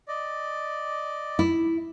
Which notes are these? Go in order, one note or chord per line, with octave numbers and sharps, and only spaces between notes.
D5 D#5
E4